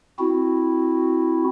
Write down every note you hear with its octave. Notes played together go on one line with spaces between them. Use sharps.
C4 E4 F#4